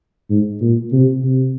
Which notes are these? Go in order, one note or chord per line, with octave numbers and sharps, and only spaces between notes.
G#2
A#2
C3
C3